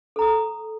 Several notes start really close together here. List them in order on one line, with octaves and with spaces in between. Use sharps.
A4 A#5 D#6